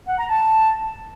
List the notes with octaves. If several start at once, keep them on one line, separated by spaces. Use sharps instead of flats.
F#5
A#5
A5